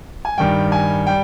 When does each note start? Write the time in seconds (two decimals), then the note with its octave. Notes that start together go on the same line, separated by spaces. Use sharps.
0.25 G#5
0.38 G2 D#3 G3 G5
0.72 G#5
1.07 G3 G5